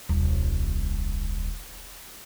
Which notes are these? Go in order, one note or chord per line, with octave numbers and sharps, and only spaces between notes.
D#1 C2